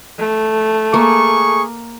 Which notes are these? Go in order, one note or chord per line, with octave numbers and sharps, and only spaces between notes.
A3
A#3 G#4 C#6